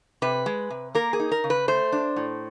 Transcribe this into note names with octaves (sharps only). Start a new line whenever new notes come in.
C3 B4
G#3
C3
A#3 A#4
G#4
D#4
A#4
C#3
B4
A3 C5
D4
A2